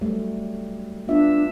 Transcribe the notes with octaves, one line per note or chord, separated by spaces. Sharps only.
F#3 G3 A3
B3 D4 F4 E5